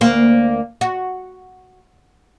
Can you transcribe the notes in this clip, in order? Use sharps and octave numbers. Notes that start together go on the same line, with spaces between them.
D2 A#3 C5
F#4